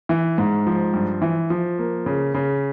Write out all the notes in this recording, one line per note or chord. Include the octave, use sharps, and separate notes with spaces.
E3
G#2
F3
G2
E3
F3
A#3
C#3
C#3